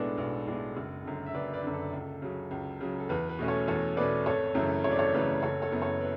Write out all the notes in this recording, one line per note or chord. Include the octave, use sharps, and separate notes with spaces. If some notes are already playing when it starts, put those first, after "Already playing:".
Already playing: B1 A2 G#3 B3 D4 A4 B4
B1
A2 G#3 B3 D4
F#1
F#2 D3
E5
F#1 B4 D5
B4 D5
F#2 D3
A4
C#2
C#3 F#3
C#2
C#3 F#3
A4
E2 B4
B4
B2 A3 C#4
A4 C#5
E2 A4 C#5
B2 A3 C#4 B4 D5
G#1 A4 C#5
F#2 C#3 E3 A3
G#1 C#5
D5
A4 C#5
F#2 C#3 E3 A3 B4
F#1 A4 C#5
A4 C#5
F#2 E3 B3
A4 C#5
B4